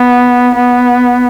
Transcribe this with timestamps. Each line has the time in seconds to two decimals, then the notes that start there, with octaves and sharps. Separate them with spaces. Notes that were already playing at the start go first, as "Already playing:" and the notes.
Already playing: B3
0.55 B3